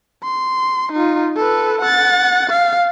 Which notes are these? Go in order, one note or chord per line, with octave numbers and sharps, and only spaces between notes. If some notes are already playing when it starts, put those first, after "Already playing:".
C6
D#4 F4
A4 B4
F#5 A6
F5